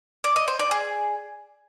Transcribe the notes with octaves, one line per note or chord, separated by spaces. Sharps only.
D5
D#5
C5
D5
G#4